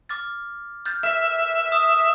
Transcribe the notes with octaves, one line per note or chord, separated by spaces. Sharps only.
D6 F6 A6
F6 G6 A6
E5 F6 B6
D#6